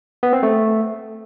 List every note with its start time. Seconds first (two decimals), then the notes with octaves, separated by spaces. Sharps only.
0.23 B3
0.33 C4
0.43 A3